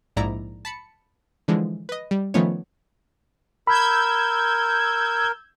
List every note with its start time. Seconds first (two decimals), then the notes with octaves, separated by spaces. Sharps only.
0.16 A#1 G#2 E4 D5 A#5
0.65 A5 B5 C#7
1.48 D3 E3 F3 G#3
1.89 B4 D#5
2.11 G3
2.34 D#3 F3 A3 B3 C#4 C#5
3.67 A#4 B5 E6 G6 G#6